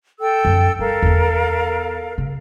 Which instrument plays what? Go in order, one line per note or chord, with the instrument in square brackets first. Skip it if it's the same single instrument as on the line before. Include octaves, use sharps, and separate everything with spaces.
[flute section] A4 G5 E6
[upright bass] F#2 F3
[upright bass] G3 [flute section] A4 A#4 F5
[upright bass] E2 B3
C#3